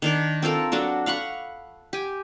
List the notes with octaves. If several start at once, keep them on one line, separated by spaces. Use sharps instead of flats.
D#3 D4 A#4
C4 F4 A4 A#4
F#3 D4 F#4 A4
F5 F#5 B5 C#6
G4 G#5